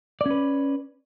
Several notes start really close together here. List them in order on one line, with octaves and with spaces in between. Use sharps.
D5 C#4 B4